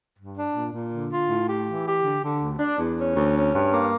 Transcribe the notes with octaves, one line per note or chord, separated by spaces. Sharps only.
G2
D4
A#2
A#2
D3
F4
A2
G4
E3
G4
D3
D3
D2
D4
E2
C#4
D2
C#4
G2
A#3